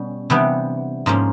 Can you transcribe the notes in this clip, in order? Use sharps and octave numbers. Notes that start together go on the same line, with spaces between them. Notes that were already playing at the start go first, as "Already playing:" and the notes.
Already playing: B2 G3 C#4
C3 E3 G3 B3 D4
G#2 F3 A#3 C#4